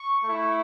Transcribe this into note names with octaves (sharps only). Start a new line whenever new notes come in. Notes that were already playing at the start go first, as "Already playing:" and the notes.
Already playing: C#6
A3 E4